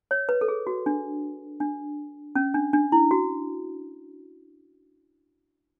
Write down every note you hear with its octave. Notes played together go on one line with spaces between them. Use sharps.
C#5
B4
A4
G#4
F#4
D4
D4
C#4
D4
D4
E4
F#4